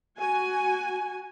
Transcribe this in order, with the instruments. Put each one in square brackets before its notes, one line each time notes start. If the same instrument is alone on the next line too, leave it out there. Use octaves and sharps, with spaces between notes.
[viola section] F#4 G#5